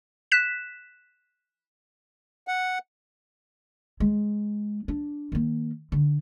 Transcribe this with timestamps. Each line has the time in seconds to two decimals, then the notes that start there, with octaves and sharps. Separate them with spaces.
0.32 F#6 B6 E7
2.48 F#5
4.00 G#3
4.88 D4
5.32 D#3 A#3
5.92 D3